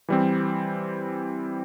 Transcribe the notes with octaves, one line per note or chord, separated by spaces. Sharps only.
E3 G3 C4